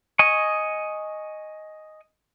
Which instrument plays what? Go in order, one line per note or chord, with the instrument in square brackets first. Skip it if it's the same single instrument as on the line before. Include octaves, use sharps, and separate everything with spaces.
[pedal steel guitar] D#5 G#5 C#6